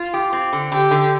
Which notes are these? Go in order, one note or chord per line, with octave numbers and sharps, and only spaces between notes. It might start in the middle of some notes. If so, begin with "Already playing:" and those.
Already playing: F4
G4
C4
D3
D3 G4
D3